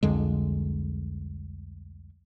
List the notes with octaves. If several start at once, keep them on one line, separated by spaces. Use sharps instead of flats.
C2 F2 D3 G#3